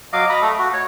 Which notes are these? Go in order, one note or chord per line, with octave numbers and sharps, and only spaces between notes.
F#3 D#5 F5 D6
D#5 A#5 B5
A3 A4
F#4
C#5